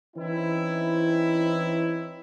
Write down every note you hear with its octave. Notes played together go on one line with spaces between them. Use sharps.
E3 C4 C#4 D#4 E4